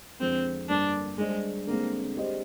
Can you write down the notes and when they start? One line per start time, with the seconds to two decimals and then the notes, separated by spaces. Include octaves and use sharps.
0.20 F2 D3 F3 G#3 C4
0.69 G2 D3 G3 A#3 D4
1.18 G3 G#3 D4 G#4 C5 D#5
1.67 D3 G#3 A#3 C4
2.16 G#3 D4 G4 C5 D#5